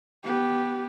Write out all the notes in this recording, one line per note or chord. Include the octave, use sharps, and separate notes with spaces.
B3 G4